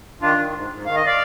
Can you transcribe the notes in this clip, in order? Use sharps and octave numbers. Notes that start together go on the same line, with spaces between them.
D#3 D4 F4
D#3
G#2
G#2
D#3 F5
D#5
D5 F5